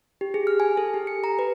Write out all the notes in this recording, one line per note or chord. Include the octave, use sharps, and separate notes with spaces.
G4
G#4
F6
G#5
A4
G4
C#7
A#5
B4